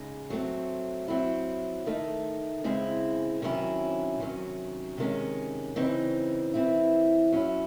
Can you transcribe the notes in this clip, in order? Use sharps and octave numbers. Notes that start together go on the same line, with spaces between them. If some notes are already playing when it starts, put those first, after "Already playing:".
Already playing: C#3 G#3 D#4
F#3 A3 C4
F#3 C4 E4
D#3 A3 D#4
C#3 G#3 C4 E4
C3 D#3 F#3 C#4 E4
C3 D#3 F#3 C#4
C3 D#3 G#3 C#4
C#3 E3 C4 D#4
E3 C4 E4
F#3 C#4 E4